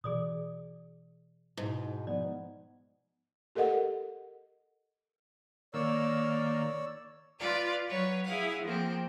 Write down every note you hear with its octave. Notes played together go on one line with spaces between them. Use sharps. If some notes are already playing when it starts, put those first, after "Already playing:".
B2 E3 G#4 D5 D#6
G#2 B2 E4
F3 B3 D5
G4 A4 A#4 D#5 F#5
D#3 A#3 C#5 D5 E6
F4 B4 D5 F5
F#3 B4 C#5
E4 G#4 F5 F#5
F3 A#3 C4